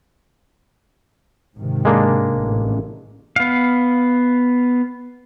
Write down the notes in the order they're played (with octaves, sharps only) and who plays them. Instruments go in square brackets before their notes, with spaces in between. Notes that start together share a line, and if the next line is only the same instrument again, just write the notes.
[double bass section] G#2 C3 D#3
[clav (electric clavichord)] G#3 A#3 D4
[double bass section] A1
[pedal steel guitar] B3 F5